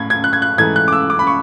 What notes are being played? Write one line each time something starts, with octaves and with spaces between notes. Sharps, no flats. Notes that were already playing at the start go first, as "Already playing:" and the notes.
Already playing: A2 G#6
G#6
F#6
G#6
F#6
G#2 E3 A3 G#6
F#6
D6
E6
D6
B5
C#6